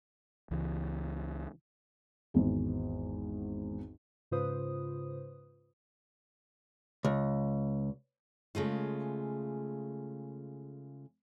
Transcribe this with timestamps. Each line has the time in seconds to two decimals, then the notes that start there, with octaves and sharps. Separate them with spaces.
0.51 C#2 E3
2.34 G#1 E2
4.31 G#2 C#3 F4 B4 C5 D#6
7.05 C#2
8.55 C#3 G#3 A3 F4